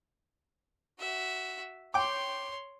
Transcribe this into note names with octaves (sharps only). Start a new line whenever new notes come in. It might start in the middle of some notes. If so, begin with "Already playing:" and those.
F#4 E5
C#5 G5 C6 D6